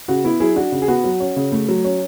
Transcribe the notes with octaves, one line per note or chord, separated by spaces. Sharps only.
C#3 F#4
B3 E4
F#3 E4 G#4
D4 F#4
C#3
G#4
B3 F#4
F#3
C#4
C#3
A3
F#3
C#4